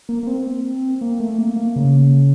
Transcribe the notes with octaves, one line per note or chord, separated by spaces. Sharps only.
A#3
A#3
C4
A#3
A3
A#3
A#3
C#3